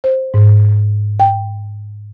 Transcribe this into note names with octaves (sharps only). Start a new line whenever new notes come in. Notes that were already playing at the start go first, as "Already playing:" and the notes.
C5
G#2
G5